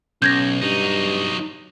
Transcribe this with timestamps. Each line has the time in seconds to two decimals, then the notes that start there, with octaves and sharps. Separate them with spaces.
0.22 B1 C#4 G6 G#6 A#6
0.62 G2 F#3 D#4